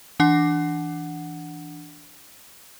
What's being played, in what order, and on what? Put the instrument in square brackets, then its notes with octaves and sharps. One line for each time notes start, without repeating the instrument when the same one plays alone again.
[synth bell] E3 D4 F#5